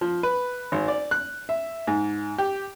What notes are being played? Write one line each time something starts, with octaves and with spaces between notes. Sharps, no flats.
F3
B4
G#1
D5
F#6
E5
G#2
G4